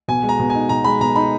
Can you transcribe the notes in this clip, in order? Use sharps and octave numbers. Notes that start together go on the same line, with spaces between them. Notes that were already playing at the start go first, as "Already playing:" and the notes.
B2 G#5
G#3
A#5
B2
G#5
D#4
B2 A#5
G#3 B5
B2 A#5
D#4 B5